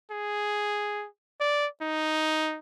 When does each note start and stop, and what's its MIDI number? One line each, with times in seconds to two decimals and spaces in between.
0.11 1.06 68
1.40 1.67 74
1.82 2.59 63